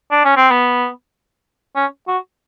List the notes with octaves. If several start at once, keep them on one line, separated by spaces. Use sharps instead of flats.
D4
C#4
C4
B3
C#4
F#4